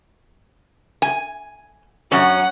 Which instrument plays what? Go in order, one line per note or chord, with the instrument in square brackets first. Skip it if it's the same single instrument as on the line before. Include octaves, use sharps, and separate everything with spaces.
[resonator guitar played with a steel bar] G#5
[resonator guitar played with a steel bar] F#2 C#4 [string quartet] F#5